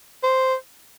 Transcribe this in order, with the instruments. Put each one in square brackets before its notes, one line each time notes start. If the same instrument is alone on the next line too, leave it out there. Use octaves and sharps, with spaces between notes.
[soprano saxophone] C5